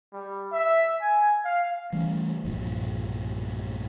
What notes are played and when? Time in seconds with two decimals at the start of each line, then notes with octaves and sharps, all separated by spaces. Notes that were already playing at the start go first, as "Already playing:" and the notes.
0.13 G3
0.52 E5
1.01 G#5
1.45 F5
1.93 E3 G3 A3 C#4
2.44 B1 G2 A#2 F3